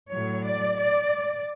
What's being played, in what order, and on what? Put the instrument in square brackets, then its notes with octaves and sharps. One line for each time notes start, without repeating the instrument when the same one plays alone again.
[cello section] A2 F#3 C#5
D5
D5